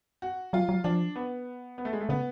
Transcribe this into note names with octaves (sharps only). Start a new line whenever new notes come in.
F#4
F#3 F4
F#3
F3 D4
B3
B3
A3
G#3
A3
C#3 B3